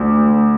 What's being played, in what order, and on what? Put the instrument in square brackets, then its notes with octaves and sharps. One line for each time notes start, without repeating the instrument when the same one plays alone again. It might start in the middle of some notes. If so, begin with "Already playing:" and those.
Already playing: [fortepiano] D2